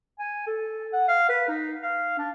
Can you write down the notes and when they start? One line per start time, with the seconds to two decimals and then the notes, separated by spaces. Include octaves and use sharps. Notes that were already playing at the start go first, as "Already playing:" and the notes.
0.19 G#5
0.47 A4
0.93 F#5
1.08 F5
1.29 B4
1.48 D#4
1.82 F5
2.18 D4